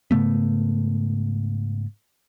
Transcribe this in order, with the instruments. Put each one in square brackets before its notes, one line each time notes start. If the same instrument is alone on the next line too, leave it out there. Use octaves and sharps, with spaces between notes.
[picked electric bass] G#2 C#3 A3 B3